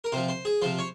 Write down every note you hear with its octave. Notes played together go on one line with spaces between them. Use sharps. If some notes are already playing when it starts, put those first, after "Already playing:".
A#4
C3 F3 C5
C5
G#4
C3 F3 C5
C#5